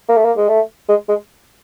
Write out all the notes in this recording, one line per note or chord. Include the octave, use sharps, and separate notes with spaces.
A#3
A3
A#3
G#3
A3
G#3
G#3